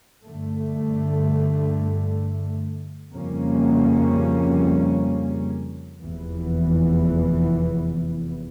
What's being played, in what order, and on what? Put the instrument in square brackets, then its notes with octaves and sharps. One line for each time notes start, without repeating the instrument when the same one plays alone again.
[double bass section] G2 D3 A3
F2 C#3 G3 A#3 C#4
F1 E2 E3